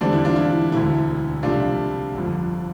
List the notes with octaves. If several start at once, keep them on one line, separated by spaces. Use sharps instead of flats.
E2 D3 G3 C4 D4
E4
D4 F4
E4
E1 D2 D3 E4
C2 C3 F3 A3 D4 F4
G1 F2 D3 F3